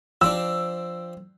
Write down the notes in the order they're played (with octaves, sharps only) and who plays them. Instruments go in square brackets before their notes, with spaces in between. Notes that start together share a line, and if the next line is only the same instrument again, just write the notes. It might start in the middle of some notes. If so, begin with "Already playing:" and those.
[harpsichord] F3 C4 D4 [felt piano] E6